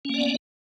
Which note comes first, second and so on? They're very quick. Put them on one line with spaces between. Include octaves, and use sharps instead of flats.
C#4 A#3 D5 B3